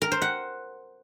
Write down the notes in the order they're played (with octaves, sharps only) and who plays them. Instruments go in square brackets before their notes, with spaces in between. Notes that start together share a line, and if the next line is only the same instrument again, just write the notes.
[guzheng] A#4
C5
F#5